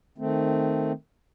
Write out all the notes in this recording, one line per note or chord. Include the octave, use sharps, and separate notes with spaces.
D#3 A3 C4